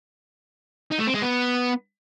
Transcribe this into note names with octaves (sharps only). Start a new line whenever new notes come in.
D#4
A3
C4
G#3
B3